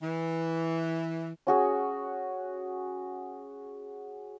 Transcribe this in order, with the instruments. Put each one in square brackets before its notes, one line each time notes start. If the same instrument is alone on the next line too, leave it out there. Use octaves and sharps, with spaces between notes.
[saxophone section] E3
[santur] C#4 F#4 G#4